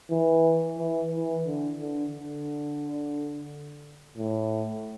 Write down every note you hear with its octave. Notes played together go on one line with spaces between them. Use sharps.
E3
E3
E3
D3
D3
D3
A2